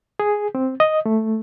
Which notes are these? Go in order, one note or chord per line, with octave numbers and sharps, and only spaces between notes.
G#4
C4
D#5
A3